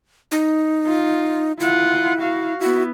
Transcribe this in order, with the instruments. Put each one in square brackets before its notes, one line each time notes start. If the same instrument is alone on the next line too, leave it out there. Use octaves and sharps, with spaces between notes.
[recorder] D#4
[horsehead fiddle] F4
[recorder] E4 [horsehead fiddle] F4 F#5
[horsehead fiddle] F#4 F5
[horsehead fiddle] B3 E4 [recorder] F#4